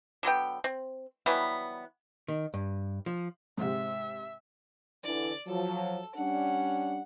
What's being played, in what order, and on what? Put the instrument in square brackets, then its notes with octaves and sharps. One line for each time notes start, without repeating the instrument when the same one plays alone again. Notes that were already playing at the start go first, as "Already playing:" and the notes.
[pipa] D3 F#3 B3 G5
C4
E3 F#3 G3 B3
[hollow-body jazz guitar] D#3
G2
F3
[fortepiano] G#2 C3 [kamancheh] E5
[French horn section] D3 E3 [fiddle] D5
[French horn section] F3 F#3 [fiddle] A4
[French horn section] G3 C#4 D4 [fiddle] F#5